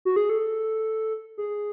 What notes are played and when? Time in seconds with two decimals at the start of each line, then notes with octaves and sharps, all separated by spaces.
0.05 F#4
0.16 G#4
0.29 A4
1.38 G#4